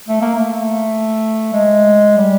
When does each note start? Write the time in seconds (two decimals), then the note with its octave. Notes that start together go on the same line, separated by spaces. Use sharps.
0.08 A3
0.21 A#3
0.35 A3
1.53 G#3
2.17 G3